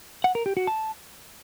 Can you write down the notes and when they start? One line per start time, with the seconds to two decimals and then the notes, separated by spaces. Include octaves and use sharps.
0.24 F#5
0.35 A#4
0.46 G4
0.57 F#4
0.67 A5